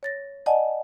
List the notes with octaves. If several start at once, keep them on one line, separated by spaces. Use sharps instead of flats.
C#5 A6 A#6
D5 D#5 F#5 G#5 A5